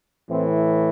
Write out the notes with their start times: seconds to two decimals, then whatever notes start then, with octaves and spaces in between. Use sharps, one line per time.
0.29 A2 E3 C4